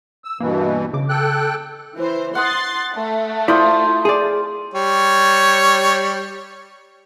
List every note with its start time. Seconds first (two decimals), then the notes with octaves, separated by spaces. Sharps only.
0.24 E6
0.40 G2 B2 E3 A#3
0.93 C#3 D6
1.09 A4 G5 F#6
1.96 E3 C5
2.35 F#5 C6 D#6 F#6 A6
2.94 A3
3.48 E4 F4 C5 D5 D#6
4.05 G#4 D5
4.74 G3 C#5